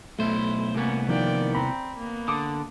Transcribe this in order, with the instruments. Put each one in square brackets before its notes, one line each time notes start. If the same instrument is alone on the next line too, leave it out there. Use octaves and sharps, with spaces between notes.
[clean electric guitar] B1 C5 [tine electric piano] A3 [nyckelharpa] E4
[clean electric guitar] C2 B3 [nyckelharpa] A#3 C#4
[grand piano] D#3 A#3 E4 [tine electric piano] F3 [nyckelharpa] D5 G5
[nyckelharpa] C4 [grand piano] A#5 [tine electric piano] B5
[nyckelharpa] A#3 B3
[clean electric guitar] D3 [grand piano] D6 D#6